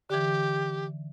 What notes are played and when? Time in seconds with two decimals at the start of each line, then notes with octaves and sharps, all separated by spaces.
0.10 D3 E3 G4